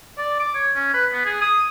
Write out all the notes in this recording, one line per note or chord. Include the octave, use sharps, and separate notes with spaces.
D5
D6
C#5
C#4
B4
B3
G#4
D#6